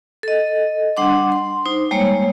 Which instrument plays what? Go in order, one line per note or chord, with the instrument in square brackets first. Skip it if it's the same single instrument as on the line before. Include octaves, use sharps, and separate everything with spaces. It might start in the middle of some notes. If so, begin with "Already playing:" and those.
[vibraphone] A4 D#5
G3 D4 F#5 C6 D6
C6
D#4 C5
G3 G#3 A#3 C#5